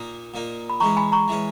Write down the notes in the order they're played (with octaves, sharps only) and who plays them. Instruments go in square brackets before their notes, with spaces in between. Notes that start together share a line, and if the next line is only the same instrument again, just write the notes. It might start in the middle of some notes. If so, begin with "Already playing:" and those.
Already playing: [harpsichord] A#2 A#3 D#4
A#2 A#3 D#4
[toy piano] B5
[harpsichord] E3 G#3 C#4 [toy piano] A#5 C#6
[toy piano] G#5 B5
A#5 C#6
[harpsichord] E3 G#3 C#4